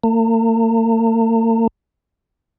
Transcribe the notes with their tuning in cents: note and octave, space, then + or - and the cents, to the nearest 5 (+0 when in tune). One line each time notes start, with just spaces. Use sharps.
A#3 -45